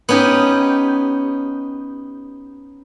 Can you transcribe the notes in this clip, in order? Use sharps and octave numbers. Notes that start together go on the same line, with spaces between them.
B3 C#4 D#4 G4